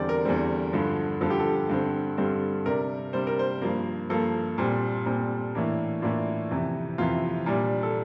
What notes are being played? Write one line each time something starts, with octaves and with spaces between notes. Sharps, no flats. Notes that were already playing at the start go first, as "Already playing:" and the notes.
Already playing: E2 D3 G3 C4 D5
A#4
E2 D3 G3 C4
G2 D3 F3
G2 D3 F3 A4
G4
A4
G2 D3 G3 C4
G2 D3 G3 C4
C3 G3 D4 A#4
C3 G3 D4 C5
A#4
C5
G2 F3 A#3
G2 F3 A#3 A4
A#2 G3 C4
A#2 G3 C4
A2 E3 A#3 D4
A2 E3 A#3 D4 F4
F2 C3 E3
F2 C3 E3 F4
A#2 G3 D4
A4